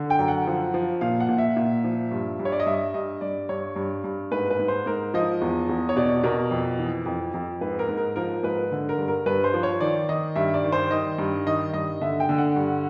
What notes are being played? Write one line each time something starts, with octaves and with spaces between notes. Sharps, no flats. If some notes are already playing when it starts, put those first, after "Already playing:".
Already playing: D3
G5
F#2
F#5
F3
F3
A#2 F5
F#5
A#2
E5
A#2
F3
G2
G2
C#5
D5
D#5
G2 E5
G2 D#5
G2 D5
G2 C#5
G2
G2
G#2 B4
B4
G#2
C5
G#2 A#4
F3 D#5
E2
E2
C#5
B2 D5
B2 A#4
F2
E3
F2
F2
G#2 B4
A#4
G#2
A#4
F3 A#4
G#2 B4
D3
A#4
G2
A#4
G2 B4
C5
F3
C#5
D#3 D5
D#3 D#5
G2 E5
D5
D#3
C5
D#3 D#5
G2
D#3 D#5
G2 D#5
D3 E5
G5
D3
F#5
G2